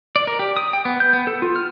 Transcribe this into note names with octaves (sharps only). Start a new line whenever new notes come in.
D5
A#4
G4
D#6
G5
B3
G6
B3
A4
F4
F6